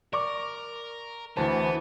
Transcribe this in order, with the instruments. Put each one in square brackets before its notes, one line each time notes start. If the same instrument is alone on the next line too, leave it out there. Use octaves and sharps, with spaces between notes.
[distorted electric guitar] A#4 [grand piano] D5 C#6 D6
[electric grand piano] D2 C5 [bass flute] E3 [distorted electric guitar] B3 [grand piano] A5